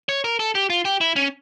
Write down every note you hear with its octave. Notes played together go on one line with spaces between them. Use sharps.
C#5
A#4
A4
G4
F4
G4
E4
C#4